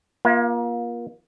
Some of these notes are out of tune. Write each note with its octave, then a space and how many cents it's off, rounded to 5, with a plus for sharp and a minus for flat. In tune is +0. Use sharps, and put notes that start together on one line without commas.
A#3 +30 F4 +0 E5 +0